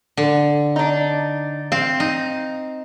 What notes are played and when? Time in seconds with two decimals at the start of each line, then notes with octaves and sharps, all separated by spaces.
0.17 D3
0.76 D4 D#4
1.72 C4 F5
2.00 D#4